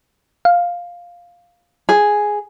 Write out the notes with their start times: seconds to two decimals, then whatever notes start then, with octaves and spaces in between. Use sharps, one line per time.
0.45 F5
1.89 G#4